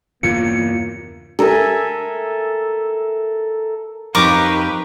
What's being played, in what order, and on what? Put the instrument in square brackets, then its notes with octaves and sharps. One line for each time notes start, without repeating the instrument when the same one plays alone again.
[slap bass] E2 G2 C#3 [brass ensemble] A#3 [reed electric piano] F4 [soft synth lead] C#7
[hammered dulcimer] A4 A#4 E5 G#5
[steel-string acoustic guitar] F2 D#4 F5 [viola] G4 B4 [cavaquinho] A#4 C#6 D6